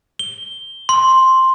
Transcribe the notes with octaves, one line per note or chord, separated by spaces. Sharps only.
G7
C6